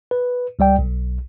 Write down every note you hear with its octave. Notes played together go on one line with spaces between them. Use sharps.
B4
C#2 G3 D5 G5
B1